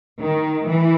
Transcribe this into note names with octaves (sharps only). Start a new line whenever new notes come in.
D#3
E3